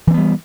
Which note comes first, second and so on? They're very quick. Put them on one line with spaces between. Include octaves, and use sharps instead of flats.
E3 C4 B3 G3